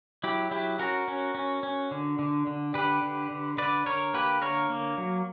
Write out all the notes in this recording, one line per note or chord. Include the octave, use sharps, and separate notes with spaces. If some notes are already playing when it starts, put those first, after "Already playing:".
F#3 E4 G4
F#3 E4 G4
C#4 F#4 A#4
C#4
C#4
C#4
D3
D3
D3
D3 G4 B4
D3
D3
D3 B4 D5
D3 A#4 C#5
A#3 G4 B4
D3 A#4 C#5
A#3
F#3